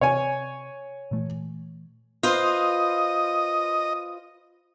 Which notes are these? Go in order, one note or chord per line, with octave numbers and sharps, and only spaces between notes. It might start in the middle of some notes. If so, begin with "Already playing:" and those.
C3 C#5 G#5
A#2 E3 A3
F4 B4 C5 D#5